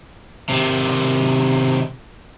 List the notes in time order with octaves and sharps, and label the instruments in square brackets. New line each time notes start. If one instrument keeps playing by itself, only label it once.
[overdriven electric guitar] C3 D#3